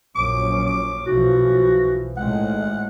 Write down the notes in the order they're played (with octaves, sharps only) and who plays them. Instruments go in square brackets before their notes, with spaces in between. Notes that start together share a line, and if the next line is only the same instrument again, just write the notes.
[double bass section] A#1 F#2 C#4 [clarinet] D6
[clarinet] D6
[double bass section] B1 E3 F3 [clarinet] F#4
[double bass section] G#1 A2 G#3 [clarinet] F#5